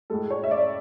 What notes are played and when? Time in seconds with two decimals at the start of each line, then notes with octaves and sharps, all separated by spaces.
0.10 A2 G#3 A4
0.30 C#5
0.44 E5
0.51 D5